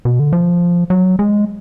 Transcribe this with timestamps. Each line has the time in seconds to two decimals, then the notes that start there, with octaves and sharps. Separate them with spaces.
0.05 B2
0.20 D3
0.33 F3
0.90 F#3
1.19 G#3